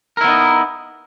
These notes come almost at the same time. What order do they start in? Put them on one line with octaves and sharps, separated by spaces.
A#4 E4 B3 D#4